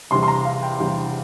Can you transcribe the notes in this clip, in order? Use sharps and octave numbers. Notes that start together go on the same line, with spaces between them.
E2 C3 G3 C6
C6
A#5
F5
G5
E2 C3 G3